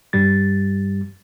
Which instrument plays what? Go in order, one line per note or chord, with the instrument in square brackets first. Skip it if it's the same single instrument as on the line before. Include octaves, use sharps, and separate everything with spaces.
[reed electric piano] G2 G3 A6